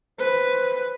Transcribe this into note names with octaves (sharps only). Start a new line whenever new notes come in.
B4 C5